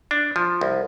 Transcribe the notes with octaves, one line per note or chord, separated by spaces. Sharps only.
D4
F3
C2